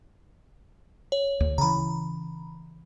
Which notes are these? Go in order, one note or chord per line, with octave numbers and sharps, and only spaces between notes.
C#5
D2
C#3 E3 A#5 B5